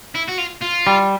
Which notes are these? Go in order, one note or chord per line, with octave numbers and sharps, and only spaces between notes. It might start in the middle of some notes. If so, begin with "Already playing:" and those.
E4
F#4
F4
F4
G3